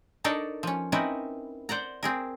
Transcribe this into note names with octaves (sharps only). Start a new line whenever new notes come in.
D4 D#4 A4 A#4 C#5 D5
F3 C#4
C4 C#4 D#4 E4 A#4 B4
C5 D5 F#5 A#5
C4 G#4 A#4